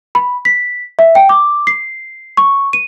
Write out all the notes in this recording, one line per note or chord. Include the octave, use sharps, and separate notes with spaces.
B5
B6
E5
G5
D6
C7
C#6
D#7